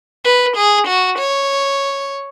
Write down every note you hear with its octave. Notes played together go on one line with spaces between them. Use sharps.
B4
G#4
F#4
C#5